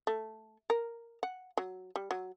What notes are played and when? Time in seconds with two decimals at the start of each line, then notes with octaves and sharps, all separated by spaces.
0.07 A3
0.70 A#4
1.23 F#5
1.57 F#3
1.96 G3
2.11 F#3